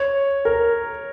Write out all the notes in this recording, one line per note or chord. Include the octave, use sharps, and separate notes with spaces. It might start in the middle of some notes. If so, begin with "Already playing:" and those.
Already playing: C#5
A#4